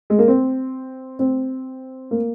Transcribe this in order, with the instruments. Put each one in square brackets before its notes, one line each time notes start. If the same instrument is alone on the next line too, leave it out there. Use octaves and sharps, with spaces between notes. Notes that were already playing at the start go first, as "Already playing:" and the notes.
[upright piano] G#3
A#3
C4
C4
A#3